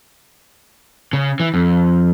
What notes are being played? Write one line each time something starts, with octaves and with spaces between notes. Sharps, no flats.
C#3
E3
F2